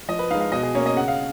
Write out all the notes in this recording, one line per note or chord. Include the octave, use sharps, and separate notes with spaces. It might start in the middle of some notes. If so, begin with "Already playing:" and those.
F3 D#5
B4
G#3 D#4 F5
F5
B2 D#5
G#4
A#3 C#4 C#5
D#5
C#3 F#5
F5